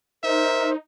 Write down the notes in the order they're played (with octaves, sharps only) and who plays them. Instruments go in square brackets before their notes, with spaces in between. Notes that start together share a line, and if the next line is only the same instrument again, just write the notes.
[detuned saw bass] D#4 [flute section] A#4 C5 [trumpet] E5